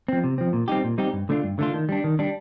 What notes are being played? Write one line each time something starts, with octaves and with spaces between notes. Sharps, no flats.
F3 C4
C3
F3 C4
A#2
G3 C4 D#4 G4
A#2
G3 C4 D#4 G4
G2
D3 A3 D4 F4
G2
D3 A3 D4 F4
D#3
G3 D4
D#3
G3 D4